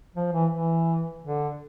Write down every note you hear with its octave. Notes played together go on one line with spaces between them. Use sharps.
F3
E3
E3
D3